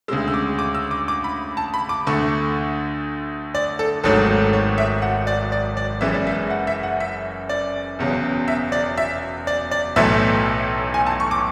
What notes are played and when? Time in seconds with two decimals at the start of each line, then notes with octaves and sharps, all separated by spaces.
0.08 G#3 E6
0.11 D2 C#3
0.28 E6
0.34 D6
0.59 D6
0.75 E6
0.91 D6
1.08 D6
1.24 B5
1.57 A5
1.74 B5
1.89 D6
2.07 D2 D3 A3 C#6
3.55 D5
3.79 A4
4.04 G#1 G#2 F#3 A3 A4
4.53 C#5
4.78 E5
5.02 F#5
5.27 D5
5.52 D5
5.77 D5
6.01 F#1 F#2 E3 G#3 E5
6.14 D5
6.27 E5
6.50 F#5
6.67 E5
6.83 F#5
7.00 E5
7.49 D5
7.99 E1 E2 C#3 F#3
8.48 E5
8.72 D5
8.98 E5
9.47 D5
9.71 D5
9.96 B1 A2 E3 A3 E5
10.94 G#5
11.07 A5
11.20 C#6
11.31 D6